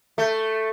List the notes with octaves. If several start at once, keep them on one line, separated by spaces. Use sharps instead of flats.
A3